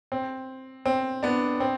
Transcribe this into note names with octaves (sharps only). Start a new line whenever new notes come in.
C4
C4
B3 D4
C4